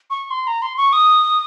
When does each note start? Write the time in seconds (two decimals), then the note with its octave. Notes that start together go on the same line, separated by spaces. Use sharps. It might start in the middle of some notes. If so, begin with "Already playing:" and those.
0.10 C#6
0.31 C6
0.47 A#5
0.62 C6
0.77 C#6
0.93 D#6